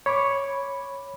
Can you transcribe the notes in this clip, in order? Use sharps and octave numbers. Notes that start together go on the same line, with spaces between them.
C#5 B5 C#6 D6